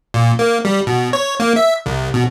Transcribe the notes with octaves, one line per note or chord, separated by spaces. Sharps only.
A#2
A#3
G3
B2
C#5
A#3
E5
C2
B2